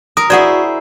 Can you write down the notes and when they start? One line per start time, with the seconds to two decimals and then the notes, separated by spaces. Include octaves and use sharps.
0.17 A#4 D#6
0.30 E4 F#4 G#4 C5 D5 F#5